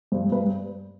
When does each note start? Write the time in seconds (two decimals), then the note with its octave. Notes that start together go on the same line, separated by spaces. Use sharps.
0.12 G2 C5
0.32 G2 B4